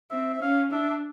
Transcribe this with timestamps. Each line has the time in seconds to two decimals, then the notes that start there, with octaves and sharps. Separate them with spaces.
0.10 C4 E5
0.34 E5
0.41 C#4 F5
0.72 D4 E5